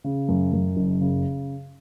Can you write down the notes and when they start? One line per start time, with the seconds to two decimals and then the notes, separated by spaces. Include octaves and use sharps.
0.04 C#3
0.28 F#2
0.53 F#2
0.76 F#1
1.01 C#3